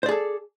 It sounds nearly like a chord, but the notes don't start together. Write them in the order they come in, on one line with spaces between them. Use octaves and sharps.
C5 D5 G#4 A4